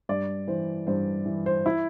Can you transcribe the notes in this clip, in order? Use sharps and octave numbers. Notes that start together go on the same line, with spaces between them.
G2 D5
E3 C5
G2 C5
E3
C5
E4